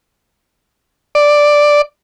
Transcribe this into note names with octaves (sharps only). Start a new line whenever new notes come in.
D5